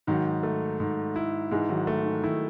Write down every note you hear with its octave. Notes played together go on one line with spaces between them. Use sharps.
G#2 D#3 F#3
A3
G#2
E4
G#2 E3 G#3
D#3 F#3
A3
D#3
D#3 E4